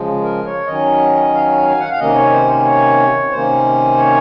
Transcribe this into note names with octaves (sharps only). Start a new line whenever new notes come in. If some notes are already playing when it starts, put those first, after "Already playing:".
Already playing: C#3 F3 G#3
A#4
C#5
D#3 F#3 C#4 D#5
F5
G#5
F#5
F5
C3 D#3 A#3 C#4 D#5
C#5
C5
C#5
C3 D#3 A#3 C#4 C5
C#5